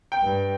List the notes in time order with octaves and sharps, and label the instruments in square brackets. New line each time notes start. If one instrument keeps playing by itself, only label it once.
[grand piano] G5
[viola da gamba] G2